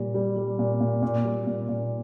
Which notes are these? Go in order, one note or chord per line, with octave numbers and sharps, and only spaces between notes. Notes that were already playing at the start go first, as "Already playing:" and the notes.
Already playing: A#2 G3
G3
G3
A#2
A#2
A#2
G3
A#2
A#2